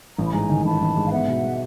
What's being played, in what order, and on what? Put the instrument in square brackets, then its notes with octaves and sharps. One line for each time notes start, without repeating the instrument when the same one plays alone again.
[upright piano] A1 [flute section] A#5
[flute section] B5
[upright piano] G#2 [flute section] G#5 A#5
[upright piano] D#3
[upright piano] A1 [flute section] A5 B5
[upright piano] A1
G#2
[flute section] F5
[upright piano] B3 [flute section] E5 F#5
[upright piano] B2
G#3